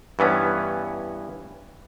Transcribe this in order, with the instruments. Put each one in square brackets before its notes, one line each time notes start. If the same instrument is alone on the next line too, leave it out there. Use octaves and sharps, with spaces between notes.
[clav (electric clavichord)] G2 E3 B3 C#4